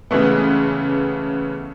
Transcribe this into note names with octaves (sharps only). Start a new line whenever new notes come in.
C#3 E3 G#3 A3 B3